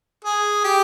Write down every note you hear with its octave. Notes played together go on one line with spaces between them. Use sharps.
G#4
G4